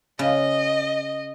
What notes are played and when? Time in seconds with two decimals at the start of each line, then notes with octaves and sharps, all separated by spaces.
0.19 C#3 D#5